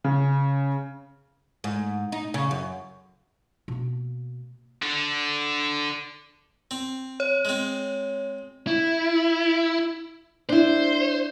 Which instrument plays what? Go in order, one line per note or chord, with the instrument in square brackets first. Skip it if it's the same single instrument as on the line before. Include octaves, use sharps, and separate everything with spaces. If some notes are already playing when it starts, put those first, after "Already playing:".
[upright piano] C#3
[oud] G#2
D#4
C#3
F#2
[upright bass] B2 A#3
[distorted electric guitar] D3 D4
[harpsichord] C4
[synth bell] C#5
[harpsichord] G#3 C4
[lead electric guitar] E4
[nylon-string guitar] D4 E4 [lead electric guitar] C5